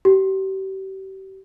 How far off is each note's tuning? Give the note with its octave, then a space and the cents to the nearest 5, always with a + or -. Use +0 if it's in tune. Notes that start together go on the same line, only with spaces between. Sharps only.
G4 -35